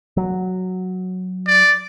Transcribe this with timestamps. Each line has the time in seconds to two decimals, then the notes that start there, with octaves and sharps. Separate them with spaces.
0.17 F#3
1.47 D5